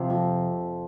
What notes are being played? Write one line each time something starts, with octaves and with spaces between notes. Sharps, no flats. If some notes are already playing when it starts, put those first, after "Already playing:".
Already playing: C3 F3
F2